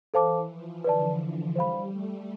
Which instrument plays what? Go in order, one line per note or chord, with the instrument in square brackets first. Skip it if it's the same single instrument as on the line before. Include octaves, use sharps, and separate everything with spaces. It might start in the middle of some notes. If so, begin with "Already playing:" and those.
[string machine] E3 [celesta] A4 C5 F5 A5 D6
[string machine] F3
[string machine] D3 [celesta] B4 D5 A5
[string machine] F3
[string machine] G3 [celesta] C5 F5 B5
[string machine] A3